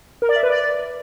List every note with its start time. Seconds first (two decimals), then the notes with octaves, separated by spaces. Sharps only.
0.22 A#4
0.29 D5
0.36 E5
0.43 B4
0.50 D5